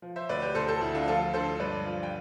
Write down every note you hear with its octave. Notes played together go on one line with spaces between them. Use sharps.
F3
C5 E5
D2 B4 D5
G4 B4
D2 A4 C5
A4 C5
D2 E4
D4 F4
F3 F4 A4
D3 A4 C5
G2 B4 D5
F3
G5